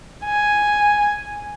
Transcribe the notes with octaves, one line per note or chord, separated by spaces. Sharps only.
G#5